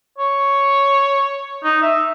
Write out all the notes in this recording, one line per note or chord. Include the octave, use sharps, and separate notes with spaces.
C#5
D#4
E5